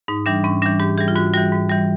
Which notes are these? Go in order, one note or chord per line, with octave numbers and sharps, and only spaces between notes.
G#2 D#4
E3 G3 D4
G#2 C#4
E3 G3 D4
G#2 G4
E3 G3 G#4
F4
G#2 F#4
E3 G3 F#4
G#2
E3 G3